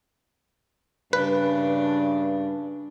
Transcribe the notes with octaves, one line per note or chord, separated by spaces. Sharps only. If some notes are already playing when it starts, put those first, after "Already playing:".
G2 C#3 D4 B4